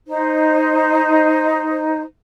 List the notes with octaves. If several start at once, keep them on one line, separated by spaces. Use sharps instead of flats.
D#4 C5